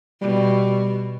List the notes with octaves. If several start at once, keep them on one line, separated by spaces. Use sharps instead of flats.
B2 G3